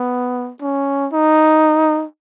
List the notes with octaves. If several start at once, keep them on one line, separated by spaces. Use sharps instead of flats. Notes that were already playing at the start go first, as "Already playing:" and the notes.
Already playing: B3
C#4
D#4